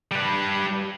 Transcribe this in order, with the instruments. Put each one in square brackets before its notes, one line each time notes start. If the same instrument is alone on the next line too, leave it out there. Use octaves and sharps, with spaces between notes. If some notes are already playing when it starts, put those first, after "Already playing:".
[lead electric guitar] G3 B4